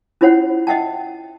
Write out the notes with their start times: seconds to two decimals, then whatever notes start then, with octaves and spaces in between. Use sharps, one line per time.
0.21 C#4 E4 F4 C5 C#5 F#5
0.67 D#5 E5 F#5 G5 A5